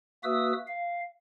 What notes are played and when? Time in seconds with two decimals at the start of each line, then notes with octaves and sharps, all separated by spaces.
0.24 A#3 F#4 B4 E5 D#6 E6
0.67 F5